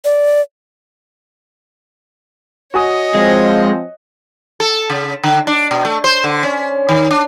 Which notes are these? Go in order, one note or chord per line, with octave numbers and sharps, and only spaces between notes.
D5
F#4 C#5 D#5 G#5 D#6
F3 G#3 C4
A4
C#3
D3
D4
B2
A3
C5
D3
C#4
D#3
D4